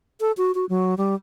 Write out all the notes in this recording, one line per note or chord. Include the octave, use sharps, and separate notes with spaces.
A4
F#4
F#4
F#3
G3